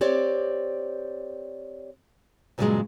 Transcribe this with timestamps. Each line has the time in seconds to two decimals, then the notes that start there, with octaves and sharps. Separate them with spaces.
0.01 C4 G4 C#5 D5
2.58 G2 A#2 C#3 E3 F#3 G#3